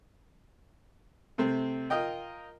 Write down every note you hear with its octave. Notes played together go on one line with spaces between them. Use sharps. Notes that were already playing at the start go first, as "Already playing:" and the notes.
C3 A3 C4
F4 A#4 D#5 G5